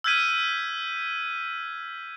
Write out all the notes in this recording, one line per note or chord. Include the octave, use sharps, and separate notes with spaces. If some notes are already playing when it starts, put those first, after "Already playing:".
E6 F6 G6 G#6 B6 D#7